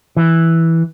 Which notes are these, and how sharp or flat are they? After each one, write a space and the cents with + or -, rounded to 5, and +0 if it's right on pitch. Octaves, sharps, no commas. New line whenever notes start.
E3 -5